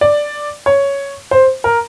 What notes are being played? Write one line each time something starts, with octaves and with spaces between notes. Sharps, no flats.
D5
C#5
C5
A#4